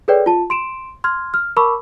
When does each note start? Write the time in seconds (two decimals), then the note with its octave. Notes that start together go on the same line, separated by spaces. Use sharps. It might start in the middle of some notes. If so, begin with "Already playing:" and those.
0.08 G#4 A4 B4 C#5 D5 G5
0.26 F4 A5
0.50 C6 D7 E7
1.04 C6 F6 G#6
1.34 F6
1.56 A#4 A5 B5 C#6 D6 E6